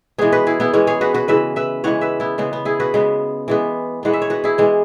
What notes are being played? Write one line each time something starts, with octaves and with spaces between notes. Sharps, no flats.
E3 G#3 B3 G#4 C#5
F#4 B4
E4 G#4
B3 E4
E3 G#3 B3 C#4
G#4 C#5
F#4 B4
F#4 B4
C#3 E3 G#3 B4 E5
B4 E5
C#3 E3 G#3 C#5 F#5
B4 E5
B3 E4
C#3 G#3 B3
B3
E4 G#4
F#4 B4
C#3 G#3 B3
E3 G#3 B3
E3 G#3 B3 F#5
E5
C#5
F#4 B4
E4 G#4
E3 G#3 B3